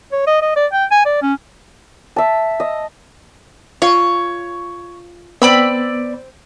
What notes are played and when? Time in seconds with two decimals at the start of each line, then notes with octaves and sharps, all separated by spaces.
0.12 C#5
0.27 D#5
0.42 D#5
0.56 D5
0.72 G5
0.91 G#5
1.06 D5
1.22 C#4
2.16 E5 A5
2.60 D#5
3.82 F4 C#5
5.42 B3 C4 D5 B5 E6